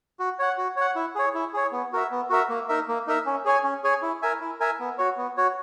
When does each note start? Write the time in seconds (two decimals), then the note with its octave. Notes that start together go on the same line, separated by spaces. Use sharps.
0.19 F#4
0.39 C#5 F#5
0.58 F#4
0.76 C#5 F#5
0.96 E4
1.15 G#4 C#5
1.34 E4
1.53 G#4 C#5
1.72 B3
1.93 F#4 A#4 E5
2.11 B3
2.30 F#4 A#4 E5
2.49 A#3
2.69 D#4 A#4 E5
2.88 A#3
3.07 D#4 A#4 E5
3.26 C#4
3.45 G#4 C#5 G#5
3.64 C#4
3.84 G#4 C#5 G#5
4.02 E4
4.22 A#4 E5 G#5
4.41 E4
4.60 A#4 E5 G#5
4.80 B3
4.98 F#4 C#5
5.17 B3
5.37 F#4 C#5